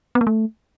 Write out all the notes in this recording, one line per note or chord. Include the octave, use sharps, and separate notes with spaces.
B3
A#3
A3